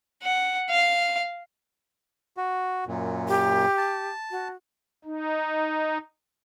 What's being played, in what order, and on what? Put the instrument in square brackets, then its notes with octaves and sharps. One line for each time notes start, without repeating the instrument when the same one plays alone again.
[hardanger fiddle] F#5
F5
[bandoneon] F#4
F#2 A#2
[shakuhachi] G4
[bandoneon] A5
[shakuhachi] F#4
[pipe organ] D#4